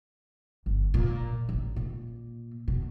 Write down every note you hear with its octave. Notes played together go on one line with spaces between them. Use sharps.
G1
A#2
A1
A#2
B2